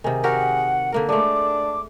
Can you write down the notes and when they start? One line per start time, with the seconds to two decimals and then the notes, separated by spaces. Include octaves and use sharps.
0.04 C3 D#3 G#4
0.24 F#4 G4 A#4 F#5
0.92 D3 A#3 A#4
1.09 G#3 A3 D4 D6